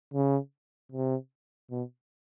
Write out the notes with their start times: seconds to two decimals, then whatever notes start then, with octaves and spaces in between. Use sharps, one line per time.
0.14 C#3
0.92 C3
1.71 B2